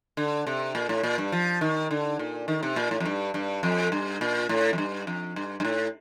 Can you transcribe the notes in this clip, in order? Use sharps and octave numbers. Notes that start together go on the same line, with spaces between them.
D3
C3
A#2
A2
A#2
G2
F3
D#3
D3
A#2
D#3
C3
A#2
A2
F2
G2
G2
F2
G2
A#2
A2
F2
G2
F2
G2
G2
A2